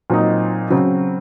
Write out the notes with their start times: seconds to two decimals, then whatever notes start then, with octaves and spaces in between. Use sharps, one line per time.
0.10 A#2 F#3 C4 D#4
0.70 C#3 F#3 C4